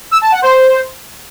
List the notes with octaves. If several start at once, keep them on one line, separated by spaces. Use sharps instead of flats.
E6
A5
F#5
C5